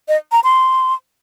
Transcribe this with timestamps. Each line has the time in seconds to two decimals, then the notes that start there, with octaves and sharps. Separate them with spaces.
0.08 D#5
0.32 A#5
0.44 C6